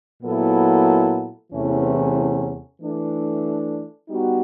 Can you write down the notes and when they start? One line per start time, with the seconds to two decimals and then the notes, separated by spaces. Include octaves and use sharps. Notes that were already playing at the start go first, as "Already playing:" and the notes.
0.23 A#2 F#3 B3 E4 A4
1.52 E2 C3 E3 A3 C#4
2.81 E3 A3 D4
4.10 G3 B3 D#4 F#4